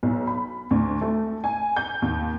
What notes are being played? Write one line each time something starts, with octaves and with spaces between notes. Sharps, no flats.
B1
B5
D2
A3
G#5
G6
D#2